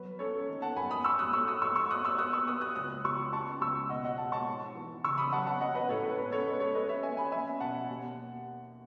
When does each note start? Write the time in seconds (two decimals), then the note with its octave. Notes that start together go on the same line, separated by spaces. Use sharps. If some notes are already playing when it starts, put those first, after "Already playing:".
Already playing: F#3 B4
0.19 C#4 A4 C#5
0.49 D#3
0.62 F#5 A5
0.76 F#2 G#5 B5
0.91 B5 D#6
1.04 G#2 C#6 E6
1.19 D#6 F#6
1.33 A3 C#6 E6
1.48 D#6 F#6
1.62 G#2 C#6 E6
1.76 C#6 E6
1.90 G#2 D#6 F#6
2.05 C#6 E6
2.18 B3 D#6 F#6
2.33 C#6 E6
2.48 B3 D#6 F#6
2.61 D#6 F#6
2.75 C#2 D#6 F#6
3.04 C#2 C#6 E6
3.33 C#4 A5 C#6
3.61 C#2 C#6 E6
3.89 B2 D#5 F#5
4.04 D#5 F#5
4.18 G#3 F#5 A5
4.32 A5 C#6
4.47 G#2
4.75 E3
5.04 C#3 C#6 E6
5.18 B5 D#6
5.32 F#3 F#5 A5
5.46 F#5 A5
5.61 C#4 D#5 F#5
5.75 B4 D#5
5.89 A2 A4 C#5
6.03 B4
6.18 C#4 B4
6.32 A4 C#5
6.46 G#3 B4
6.60 A4 C#5
6.74 C#4 B4 D#5
6.89 C#5 E5
7.03 C#4 E5 G#5
7.17 G#5 B5
7.32 C#4 E5 G#5
7.60 B2 F#5 A5
7.89 D#2